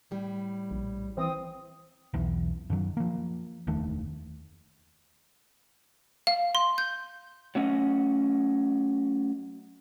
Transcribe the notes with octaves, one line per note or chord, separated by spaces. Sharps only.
A2 G3
A#1
E3 C4 D#6
B1 E2
F#2 D#3 F#3
F3 A#3
F1 D#2 D#3 A3
F5
C6
G6
F#3 A3 C#4 D#5 F#5